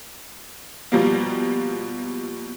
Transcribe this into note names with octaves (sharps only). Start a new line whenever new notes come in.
B2 F3 G3 A#3